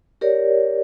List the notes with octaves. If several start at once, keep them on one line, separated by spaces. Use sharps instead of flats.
G4 A#4 C#5 D5